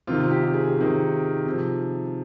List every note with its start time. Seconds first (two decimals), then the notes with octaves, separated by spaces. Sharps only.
0.07 C3 D#3 F4
0.19 F4
0.30 G4
0.44 G4
0.53 G#4
0.77 C3 D#3
1.46 C3
1.51 F3